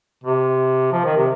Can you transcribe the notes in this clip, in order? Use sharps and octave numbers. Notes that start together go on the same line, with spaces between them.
C3
F3
D#3
C3